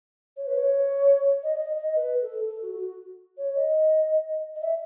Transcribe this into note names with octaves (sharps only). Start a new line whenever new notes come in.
C#5
B4
C#5
D#5
D#5
D#5
B4
A4
A4
F#4
F#4
C#5
D#5
D#5
E5